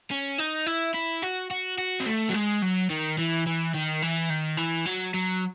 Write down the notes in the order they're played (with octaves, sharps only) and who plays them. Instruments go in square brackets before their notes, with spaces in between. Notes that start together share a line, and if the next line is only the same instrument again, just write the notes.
[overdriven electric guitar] C#4
D#4
E4
E4
F#4
F#4
F#4
C4
A3
F#3
G#3
F#3
D#3
E3
E3
D#3
E3
D#3
E3
F#3
F#3